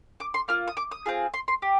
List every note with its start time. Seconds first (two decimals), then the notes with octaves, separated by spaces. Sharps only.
0.20 D6
0.34 C6
0.48 A#3 F4 F6
0.68 D#6
0.77 D6
0.91 D#6
1.06 C4 F4 G#4
1.34 C6
1.48 C6
1.62 G4